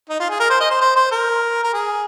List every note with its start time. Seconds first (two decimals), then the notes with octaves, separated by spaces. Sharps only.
0.10 D#4
0.20 F4
0.30 G#4
0.40 A#4
0.50 C5
0.60 D#5
0.70 C5
0.81 C5
0.96 C5
1.12 A#4
1.64 A#4
1.74 G#4